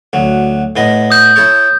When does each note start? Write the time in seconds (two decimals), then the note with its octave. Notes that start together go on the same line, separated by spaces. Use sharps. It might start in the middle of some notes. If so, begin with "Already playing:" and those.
0.13 D2 F#3
0.76 A2 B3 D#5
1.10 D#6 G6
1.36 E4 A4 C#5